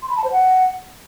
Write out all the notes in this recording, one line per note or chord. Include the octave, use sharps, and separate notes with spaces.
C6
B5
A5
C5
F#5